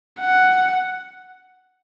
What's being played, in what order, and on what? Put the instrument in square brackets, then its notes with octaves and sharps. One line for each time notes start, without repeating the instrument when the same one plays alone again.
[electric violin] F#5